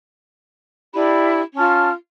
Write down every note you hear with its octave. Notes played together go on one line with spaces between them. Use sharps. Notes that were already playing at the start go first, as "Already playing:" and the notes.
D4 E4 G4 B5
C#4 F4 A5 F6